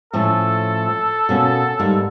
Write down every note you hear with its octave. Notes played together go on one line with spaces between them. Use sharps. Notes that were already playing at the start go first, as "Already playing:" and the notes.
A2 F3 C#4 A4
B2 A#3 C#4
G#2 G3 A#3